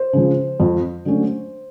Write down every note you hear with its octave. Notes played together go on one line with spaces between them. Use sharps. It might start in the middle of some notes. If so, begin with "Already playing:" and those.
Already playing: C5
C#3 F3
F2
D3 F#3 A3 C#4